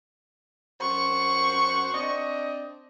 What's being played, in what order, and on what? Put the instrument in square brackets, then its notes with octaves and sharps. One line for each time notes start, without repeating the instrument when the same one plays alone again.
[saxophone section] F#2 C5 F#5 [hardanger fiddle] C#6
[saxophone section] C4 D4 D#5